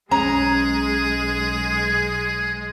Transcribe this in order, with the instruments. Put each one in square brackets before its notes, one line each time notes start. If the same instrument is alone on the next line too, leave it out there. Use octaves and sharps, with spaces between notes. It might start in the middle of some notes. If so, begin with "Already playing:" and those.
[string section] B1 G#3 [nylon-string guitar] C#4 [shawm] G#4 [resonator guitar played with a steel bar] A#5